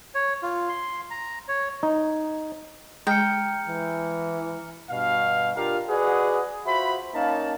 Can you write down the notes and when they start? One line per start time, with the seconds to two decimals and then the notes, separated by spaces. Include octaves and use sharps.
0.15 C#5
0.43 F4
0.69 C6
1.11 A#5
1.48 C#5
1.83 D#4
3.07 G#3 G5 A#5 F6 C#7
3.68 E3
4.90 G2 B2 F5
5.56 D4 F4 G4 A#4 F5
5.89 F#4 G#4 B4 D5 D#5 F#5
6.65 F4 F#4 C5 E5 B5
7.14 A#3 C#4 D#4 F5 A5